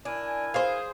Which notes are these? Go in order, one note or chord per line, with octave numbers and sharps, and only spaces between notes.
D4 E4 A#4 G#5
G#4 C5 F5